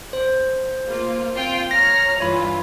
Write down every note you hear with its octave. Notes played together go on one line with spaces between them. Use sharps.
C5
A#3 F4
C4 F4 G5
C#5 A#5 F6 A#6
G2 E3 F4 C#5 B5